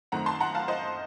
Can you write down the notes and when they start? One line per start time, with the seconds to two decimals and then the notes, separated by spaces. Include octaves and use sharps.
0.12 F#2 D#3 A3 C4 F#5 A#5
0.26 A5 C6
0.40 F#5 A#5
0.55 F5 A5
0.68 C5 D#5